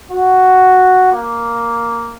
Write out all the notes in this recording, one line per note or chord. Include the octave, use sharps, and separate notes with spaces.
F#4
A#3